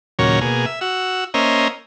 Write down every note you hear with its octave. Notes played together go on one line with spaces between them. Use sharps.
D#2 A#2 C#3 F#3 A#4 C#5
B2 A#3 G#4
E5
F#4 E6
A#3 C#4 C5 D#5 E5 A#5